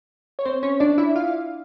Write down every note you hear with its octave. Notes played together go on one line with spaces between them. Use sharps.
C#5
C4 C5
C#4 C#5
D4 D5
E4 E5
F4 F5